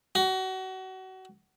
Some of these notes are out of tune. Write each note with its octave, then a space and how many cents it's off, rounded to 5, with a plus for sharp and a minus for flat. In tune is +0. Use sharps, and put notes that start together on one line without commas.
F#4 +30